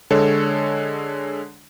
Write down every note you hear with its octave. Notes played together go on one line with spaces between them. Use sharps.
D3 G#3 A4 C#5